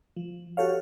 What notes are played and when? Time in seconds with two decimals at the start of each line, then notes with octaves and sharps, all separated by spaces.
0.17 F3
0.57 F#4 G4 A4 C#5 F5